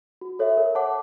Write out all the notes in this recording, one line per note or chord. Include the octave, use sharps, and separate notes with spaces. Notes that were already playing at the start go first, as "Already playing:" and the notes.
F#4
A4 C#5 E5
A#4
C#5 F#5 A5 D6